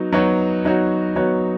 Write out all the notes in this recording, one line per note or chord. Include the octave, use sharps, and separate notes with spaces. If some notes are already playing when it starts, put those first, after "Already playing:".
Already playing: F#3 B3 D#4 F#4
F#3 B3 D#4 F#4 C#5
F#3 B3 D#4 F#4 C#5
F#3 B3 D#4 F#4 C#5